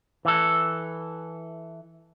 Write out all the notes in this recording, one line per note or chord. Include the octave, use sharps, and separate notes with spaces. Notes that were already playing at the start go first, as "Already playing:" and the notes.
E3 A4